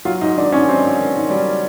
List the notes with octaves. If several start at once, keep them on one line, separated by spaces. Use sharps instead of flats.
F#3 F4
G#2 D#4
D#3 D4
G#2 C#4
F#3 C4
G#2
D#3
G#2
F#3 G3